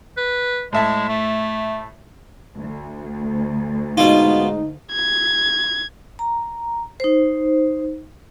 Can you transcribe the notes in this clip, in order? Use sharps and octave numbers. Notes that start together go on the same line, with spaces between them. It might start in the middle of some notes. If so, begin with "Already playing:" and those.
B4
A2 G#3 E5 A5
A3
D2
G#2 B2 D#4 F4
G#6
A#5
D#4 C5